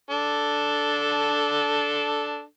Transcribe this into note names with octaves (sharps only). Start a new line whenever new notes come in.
D4 A4